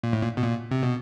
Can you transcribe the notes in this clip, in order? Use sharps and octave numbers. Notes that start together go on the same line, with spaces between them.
A#2
A2
A#2
B2
A#2
C3
B2